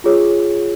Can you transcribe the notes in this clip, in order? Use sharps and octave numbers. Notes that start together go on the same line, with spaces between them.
F4 G#4 C#5